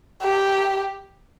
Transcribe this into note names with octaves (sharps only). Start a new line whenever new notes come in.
G4